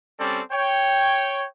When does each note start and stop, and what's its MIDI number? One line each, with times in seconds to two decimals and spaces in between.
0.19 0.41 55
0.19 0.41 60
0.19 0.41 61
0.19 0.41 69
0.19 0.41 74
0.52 1.45 73
0.52 1.45 79